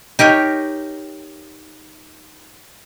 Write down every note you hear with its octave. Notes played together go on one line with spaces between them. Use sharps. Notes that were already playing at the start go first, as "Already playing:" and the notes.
D#4 G4 A#4 C#5